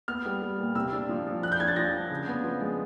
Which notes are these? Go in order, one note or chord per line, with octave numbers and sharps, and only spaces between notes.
B3 F6
G3
G3
A#2
C3 E6
D4
F3
F3
D4 F#6
G6
D4 G#6
A6
F3 A#6
D4
C#3
B3
F3
G#3